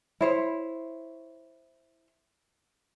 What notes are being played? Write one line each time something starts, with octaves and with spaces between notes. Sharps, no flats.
E4 C5 C#5